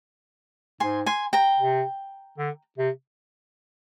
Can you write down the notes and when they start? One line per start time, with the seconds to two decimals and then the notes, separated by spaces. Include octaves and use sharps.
0.80 G#2 G#5 C6
1.06 G#5 C6
1.33 G5 A#5
1.59 C3
2.38 D3
2.78 C3